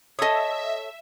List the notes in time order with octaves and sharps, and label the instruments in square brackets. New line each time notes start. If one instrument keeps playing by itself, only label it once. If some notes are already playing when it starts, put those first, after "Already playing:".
[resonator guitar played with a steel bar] A4 C#5 [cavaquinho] D#5 D#6 [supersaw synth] E5